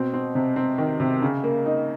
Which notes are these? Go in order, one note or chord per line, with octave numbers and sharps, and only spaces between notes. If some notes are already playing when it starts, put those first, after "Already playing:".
Already playing: B2 C4
C4
C3
C4
D#3
C3
C#3
A#3
D#4